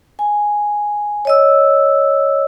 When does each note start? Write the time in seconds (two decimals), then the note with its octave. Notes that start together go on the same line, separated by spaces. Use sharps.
0.19 G#5
1.25 C#5 D#5 E6